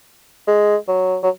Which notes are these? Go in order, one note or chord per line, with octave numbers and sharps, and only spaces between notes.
G#3
F#3
F#3